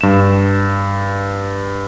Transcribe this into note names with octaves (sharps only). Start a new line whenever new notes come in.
G2 E7